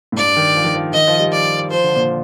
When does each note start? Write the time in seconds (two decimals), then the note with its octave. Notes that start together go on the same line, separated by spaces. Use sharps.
0.12 A2
0.17 G2 D5
0.36 D#3
0.55 F3
0.64 D#3
0.75 F3
0.93 D#3 D#5
1.07 F3
1.19 G3
1.32 D5
1.71 F3 C5
1.84 D3
1.96 A#2